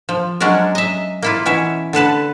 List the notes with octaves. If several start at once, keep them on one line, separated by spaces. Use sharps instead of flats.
F3
F#3 G#3 C#4 D4 A#4
D#5 E5
A#3 E4 F4
B2 E3 C#4 E5
D3 A4 B4 A5